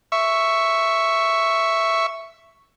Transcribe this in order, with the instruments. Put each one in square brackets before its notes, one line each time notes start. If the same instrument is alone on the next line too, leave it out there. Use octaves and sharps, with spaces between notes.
[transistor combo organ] E5 C#6